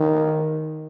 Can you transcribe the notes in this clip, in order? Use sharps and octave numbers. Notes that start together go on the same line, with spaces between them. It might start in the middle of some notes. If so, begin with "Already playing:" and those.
Already playing: D#3